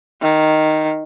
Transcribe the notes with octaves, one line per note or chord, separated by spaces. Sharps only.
D#3